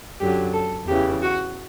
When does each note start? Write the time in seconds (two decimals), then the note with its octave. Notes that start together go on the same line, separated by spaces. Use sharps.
0.20 F#2 D3 F#3 G4
0.53 A4
0.87 E2 C#3 E3 G4
1.22 F#4